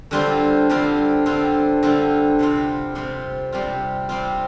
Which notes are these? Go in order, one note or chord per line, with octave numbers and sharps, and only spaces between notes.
D3 G3 C4 F4
D3 G3 C4 F4
D3 G3 C4 F4
D3 G3 C4 F4
C3 G3 C4 F4
C3 G3 C4 F4
C3 G3 C4 F4
C3 G3 C4 F4